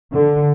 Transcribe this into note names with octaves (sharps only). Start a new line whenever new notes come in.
D3